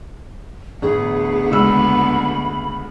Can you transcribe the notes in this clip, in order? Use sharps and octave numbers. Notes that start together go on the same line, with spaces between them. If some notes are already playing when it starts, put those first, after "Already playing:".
A1 D2 B3 G#4
C#3 G#3 B5 E6